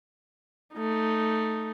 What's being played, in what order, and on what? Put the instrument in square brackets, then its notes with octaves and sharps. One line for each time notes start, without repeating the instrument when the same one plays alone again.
[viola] A3 D#4